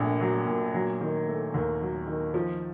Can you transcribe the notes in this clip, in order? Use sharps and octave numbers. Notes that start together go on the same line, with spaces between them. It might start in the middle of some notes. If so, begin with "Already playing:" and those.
Already playing: A#1 A#2 A3
F#3
A#2
F#3
D#3
A3
D#2
F#3
D#3
F3